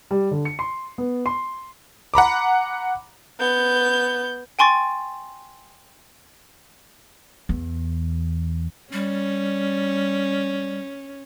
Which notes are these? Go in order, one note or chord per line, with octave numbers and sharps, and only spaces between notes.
G3
D3
C#7
C6
B3
C6
F#5 A#5 B5 D6
B3 G6
G5 G#5 C6 C#6 A6
E2
G3 C#4